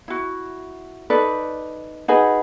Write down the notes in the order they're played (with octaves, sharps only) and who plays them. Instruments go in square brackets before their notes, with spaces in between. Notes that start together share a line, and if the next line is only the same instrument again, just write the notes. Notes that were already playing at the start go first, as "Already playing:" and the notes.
[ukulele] E4 F#4
D#4 A4 B4 D5
D#4 F#4 G#4 B4